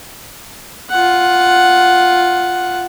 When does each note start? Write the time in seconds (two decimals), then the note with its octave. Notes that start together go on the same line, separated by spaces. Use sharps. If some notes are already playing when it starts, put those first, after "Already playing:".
0.90 F4 F#5